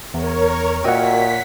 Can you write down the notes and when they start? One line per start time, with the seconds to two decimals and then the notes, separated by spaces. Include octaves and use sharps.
0.14 E2 A#4 C#5
0.84 A#2 F#4 D#5 E5 F#5 G5 B6